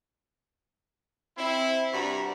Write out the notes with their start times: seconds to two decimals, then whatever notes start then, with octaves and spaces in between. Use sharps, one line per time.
1.37 C4 E4
1.93 G2 C3 D4 F#4 A#5 B5